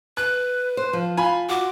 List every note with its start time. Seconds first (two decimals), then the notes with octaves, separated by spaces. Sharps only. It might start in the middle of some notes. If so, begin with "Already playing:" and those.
0.17 B4 F#6
0.77 C5
0.93 F3
1.17 F4 G#5 B5
1.49 F#4 D6